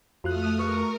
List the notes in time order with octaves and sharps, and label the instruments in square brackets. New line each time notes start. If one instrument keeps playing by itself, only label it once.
[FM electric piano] F2 F4 F#6 [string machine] A3 D#6 F6 [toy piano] F#4
[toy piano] G#4 B4 [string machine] A#4 [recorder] C#6